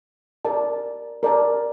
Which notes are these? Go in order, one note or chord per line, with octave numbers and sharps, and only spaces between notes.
A#4 D5 A5
A#4 D5 A5